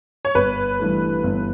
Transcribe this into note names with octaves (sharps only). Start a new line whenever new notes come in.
C#5
G1 B4
G2 E3 A3
G1